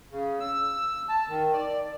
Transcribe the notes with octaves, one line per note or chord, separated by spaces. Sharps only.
C#3
E6
A5
D#3
D5